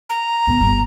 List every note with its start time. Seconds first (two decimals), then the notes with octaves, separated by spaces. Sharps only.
0.10 A#5
0.47 D3 B3
0.61 G1